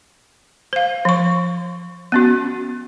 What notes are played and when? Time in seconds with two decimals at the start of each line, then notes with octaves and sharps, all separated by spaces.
0.73 C5 F5
1.05 F3 C#6
2.12 B3 C#4 F#4